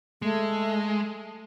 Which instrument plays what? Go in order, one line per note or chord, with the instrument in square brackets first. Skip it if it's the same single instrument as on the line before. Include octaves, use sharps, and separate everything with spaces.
[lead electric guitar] G#3 [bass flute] A3